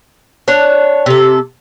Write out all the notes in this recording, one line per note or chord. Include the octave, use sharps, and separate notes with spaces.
D4 C#5 F#5
C3 A4